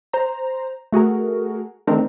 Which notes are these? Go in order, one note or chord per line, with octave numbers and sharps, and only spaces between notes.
C5 A#5
A3 F#4 G#4 A#4
D#3 E3 A3 C4 D4 A#4